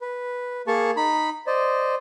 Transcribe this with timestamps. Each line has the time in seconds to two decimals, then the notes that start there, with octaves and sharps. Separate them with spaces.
0.01 B4
0.67 A#3 G#4 A5 C#6
0.97 D#4 B5
1.47 C5 D5 D#5